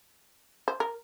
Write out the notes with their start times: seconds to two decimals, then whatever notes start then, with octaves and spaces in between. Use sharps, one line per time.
0.68 C5
0.80 A#4